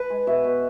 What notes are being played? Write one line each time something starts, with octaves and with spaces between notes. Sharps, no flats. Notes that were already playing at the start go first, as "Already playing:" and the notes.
Already playing: B4
G#3
B2 E5
B2